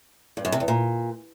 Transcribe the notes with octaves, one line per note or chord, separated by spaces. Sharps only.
G2
F#2
C3
E2
A#2